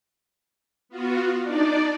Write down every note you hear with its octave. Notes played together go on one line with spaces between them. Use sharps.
B3 F4 F#4
D4 D#4 D5